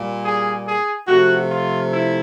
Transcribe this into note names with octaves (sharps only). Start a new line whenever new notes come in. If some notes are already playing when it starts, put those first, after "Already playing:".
Already playing: A#2 G3 A#3
G#4
G#4
C3 F3 A3 F#4
F4
E4